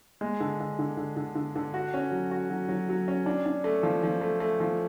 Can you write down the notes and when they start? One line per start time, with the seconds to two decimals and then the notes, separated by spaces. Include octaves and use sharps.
0.21 G#3
0.40 D3
0.60 D3
0.79 D3
0.97 D3
1.17 D3
1.35 D3
1.56 D3
1.74 F#4
1.94 C#4
2.12 F#3
2.31 F#4
2.50 F#3
2.69 F#3
2.89 F#3
3.08 C#4
3.26 D4
3.46 D4
3.64 A3
3.83 F3
4.03 F3
4.21 A3
4.40 A3
4.60 F3